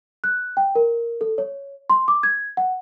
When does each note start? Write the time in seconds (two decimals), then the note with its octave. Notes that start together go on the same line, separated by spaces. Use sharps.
0.24 F#6
0.57 G5
0.75 A#4
1.21 A4
1.38 C#5
1.90 C6
2.08 D6
2.23 G#6
2.57 F#5